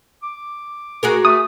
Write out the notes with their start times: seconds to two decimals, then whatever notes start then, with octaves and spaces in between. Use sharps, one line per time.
0.23 D6
1.03 F#4 G#4 A#4
1.25 A3 D#6